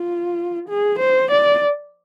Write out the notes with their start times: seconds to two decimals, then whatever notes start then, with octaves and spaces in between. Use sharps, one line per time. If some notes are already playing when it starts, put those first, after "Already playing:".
Already playing: F4
0.69 G#4
0.99 C5
1.31 D5